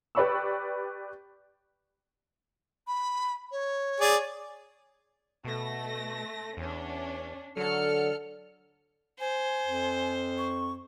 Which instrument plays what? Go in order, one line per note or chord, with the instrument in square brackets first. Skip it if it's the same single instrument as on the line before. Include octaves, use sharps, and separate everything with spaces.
[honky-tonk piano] G4 B4 D5 B5 C#6 E6
[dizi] B5
C#5
[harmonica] G#4 D5
[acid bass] B2 [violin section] A3 A#6
[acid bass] E2 [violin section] C#4 D4
[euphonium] D3 [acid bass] F#3 [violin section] A4 F6 C#7
[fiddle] C5 [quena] G#5
[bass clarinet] F2
[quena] C#6